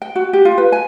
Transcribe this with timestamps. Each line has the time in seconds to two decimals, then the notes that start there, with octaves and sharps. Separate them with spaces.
0.02 G5
0.15 F#4
0.33 G4
0.45 F4
0.58 B4
0.72 G#5